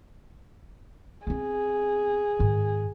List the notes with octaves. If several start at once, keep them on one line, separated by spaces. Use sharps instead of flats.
B3 C4 G#4
G#2 D#3